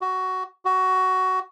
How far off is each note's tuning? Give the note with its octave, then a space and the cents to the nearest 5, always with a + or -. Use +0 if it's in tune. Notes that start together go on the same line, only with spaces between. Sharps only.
F#4 +10
F#4 +15